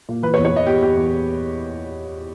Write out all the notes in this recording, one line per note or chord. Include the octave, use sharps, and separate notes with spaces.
A#2
E3 B4
C#5
E2
C#5
E2 D#5
E2 G4
E2 G4
E2